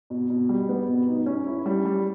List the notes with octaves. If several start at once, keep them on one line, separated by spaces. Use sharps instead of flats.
B2
B2
G3
B3
B2
D#4
C#4
E4
G3
G3